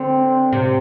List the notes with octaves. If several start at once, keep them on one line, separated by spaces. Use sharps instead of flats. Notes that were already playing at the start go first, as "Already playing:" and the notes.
Already playing: D3 C4
C3